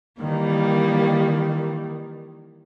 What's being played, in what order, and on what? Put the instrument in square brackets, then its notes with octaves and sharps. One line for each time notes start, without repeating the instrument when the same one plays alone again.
[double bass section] D#3 [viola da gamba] E3 G3 A#3